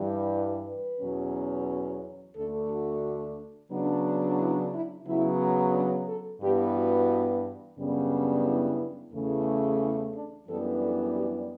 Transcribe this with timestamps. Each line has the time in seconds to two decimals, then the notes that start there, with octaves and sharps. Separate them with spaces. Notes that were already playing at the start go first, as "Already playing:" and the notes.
Already playing: G2 E3 G3
0.32 B4
0.66 B4
1.00 E2 B2 F#3 C#4
2.35 D2 D3 A3 D4 A4
2.69 F#4
3.71 C#3 F#3 B3 D4
4.39 E4
4.72 E4
5.06 C#3 F#3 B3 E4
5.73 D4
6.07 A4
6.42 G2 E3 B3 G4
6.76 F#4
7.77 F#2 C#3 G3 B3 D4
8.45 E4
9.12 E2 C#3 E3 A3
9.80 E4
10.14 D4
10.48 F#2 E3 G3 B3 D4 A4
10.82 A4
11.15 G4